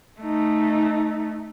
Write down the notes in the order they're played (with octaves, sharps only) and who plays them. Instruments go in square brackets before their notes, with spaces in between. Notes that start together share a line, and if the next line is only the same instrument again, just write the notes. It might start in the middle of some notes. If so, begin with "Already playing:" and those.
[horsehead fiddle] A3 D#4